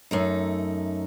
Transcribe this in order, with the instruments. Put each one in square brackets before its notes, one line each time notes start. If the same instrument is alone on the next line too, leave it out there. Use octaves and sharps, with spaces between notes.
[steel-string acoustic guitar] F#2 A3 D#4